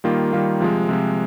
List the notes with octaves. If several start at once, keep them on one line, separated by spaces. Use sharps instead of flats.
D#3 G3 A#3 F4
D#3 G3 A#3 F4
C3 F3 G#3
C3 F3 G#3